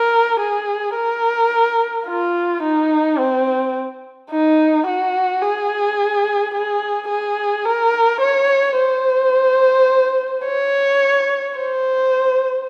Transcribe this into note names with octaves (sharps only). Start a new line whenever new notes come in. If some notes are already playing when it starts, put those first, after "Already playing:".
Already playing: A#4
G#4
A#4
F4
D#4
C4
D#4
F#4
G#4
G#4
G#4
A#4
C#5
C5
C#5
C5